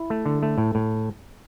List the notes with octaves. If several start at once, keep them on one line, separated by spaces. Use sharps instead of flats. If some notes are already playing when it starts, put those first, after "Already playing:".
Already playing: E4
A3
D3
A3
A2
A2